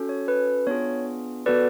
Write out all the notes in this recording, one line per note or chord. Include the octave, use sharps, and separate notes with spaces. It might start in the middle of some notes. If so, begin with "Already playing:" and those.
Already playing: C#4 F#4 A4
C#5
B4
B3 D4 F4 G#4 C#5
B3 F#4 A4 B4 D5